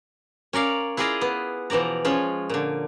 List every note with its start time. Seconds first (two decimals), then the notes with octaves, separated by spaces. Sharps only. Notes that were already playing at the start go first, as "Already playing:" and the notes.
0.53 C#4 A#4 D5 F5
0.97 E4 F4 G#4 D5 D#5 F5
1.21 B3
1.70 B2 E3 F3 D5 A#5
2.05 F3 G#3 C#4 F4
2.49 A#2 D3